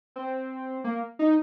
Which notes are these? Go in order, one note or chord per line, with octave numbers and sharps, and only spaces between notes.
C4
A#3
D#4